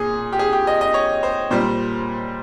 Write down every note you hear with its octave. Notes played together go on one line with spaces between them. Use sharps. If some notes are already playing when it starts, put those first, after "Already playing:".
Already playing: A#2 G#4
G4
G#4
G4
D#5
D#5
C#5
C5
A#2 G3 C5